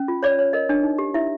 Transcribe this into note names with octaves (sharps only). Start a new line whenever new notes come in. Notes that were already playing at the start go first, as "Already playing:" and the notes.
Already playing: C#4
F4
C#5 D5
C#5
A#4 D#5
D4
D#4
G4
E4 E5